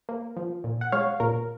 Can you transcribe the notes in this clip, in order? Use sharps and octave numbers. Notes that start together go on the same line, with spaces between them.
A#3
F3
A#2
F#5
G#3 C#5 F5
A#2 A#4